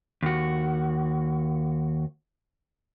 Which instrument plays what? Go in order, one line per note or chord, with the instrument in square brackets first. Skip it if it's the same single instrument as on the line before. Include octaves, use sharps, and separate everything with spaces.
[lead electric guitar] D#2 F#4